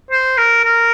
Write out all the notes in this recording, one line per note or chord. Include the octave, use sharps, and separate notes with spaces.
C5
A#4
A#4